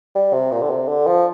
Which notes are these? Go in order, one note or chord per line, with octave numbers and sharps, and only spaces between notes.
G3
C3
A#2
D3
C3
D3
F3